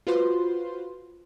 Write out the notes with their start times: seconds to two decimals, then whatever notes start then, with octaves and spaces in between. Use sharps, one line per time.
0.07 F4 F#4 B4 C5 C6